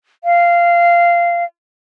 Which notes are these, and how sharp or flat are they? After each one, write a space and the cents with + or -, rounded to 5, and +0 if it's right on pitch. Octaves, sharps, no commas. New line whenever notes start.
F5 -15